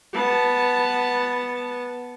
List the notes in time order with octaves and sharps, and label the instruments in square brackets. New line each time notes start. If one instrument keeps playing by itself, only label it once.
[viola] B3 A5